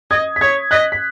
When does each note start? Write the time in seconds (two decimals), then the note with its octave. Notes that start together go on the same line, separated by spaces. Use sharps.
0.11 D#5 D#6 G#6
0.36 B6
0.41 C#5 D#6 G#6
0.71 D#5 F#6 B6
0.92 B6